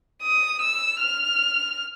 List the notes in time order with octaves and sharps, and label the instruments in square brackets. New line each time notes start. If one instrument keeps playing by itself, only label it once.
[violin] D#6
E6
F6